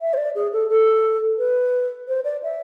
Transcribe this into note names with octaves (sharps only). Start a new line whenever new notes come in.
E5
C5
D5
G#4
A4
A4
B4
C5
D5
E5